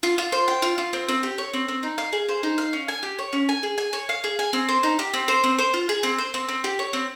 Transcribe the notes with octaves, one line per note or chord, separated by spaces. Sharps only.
F4
F4
C5
G5
F4
F4
C4
C4
G4
C#5
C4
C4
D#4
F5
G#4
C5
D#4
F5
C#4
G#5
G4
C#5
C#4
G#5
G#4
G#5
C#5
F5
G#4
G#5
C4
C5
D#4
G4
C4
C5
C4
C5
F4
G#4
C4
C5
C4
C4
G4
C#5
C4